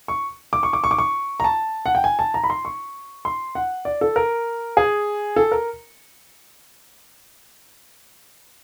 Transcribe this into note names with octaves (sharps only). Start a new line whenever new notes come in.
C#6
D6
C#6
D6
C#6
D6
C#6
A#5
A5
F#5
G5
G#5
A5
A#5
B5
C6
C#6
C6
F#5
D5
A4
A#4
G#4
A4
A#4